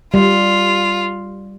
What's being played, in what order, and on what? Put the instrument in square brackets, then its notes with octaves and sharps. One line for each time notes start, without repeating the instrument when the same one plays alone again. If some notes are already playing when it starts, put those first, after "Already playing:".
[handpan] G3 [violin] F4